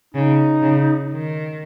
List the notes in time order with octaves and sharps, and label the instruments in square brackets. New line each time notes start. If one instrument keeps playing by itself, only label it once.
[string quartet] C#3 [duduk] D#4
[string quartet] C#3
D#3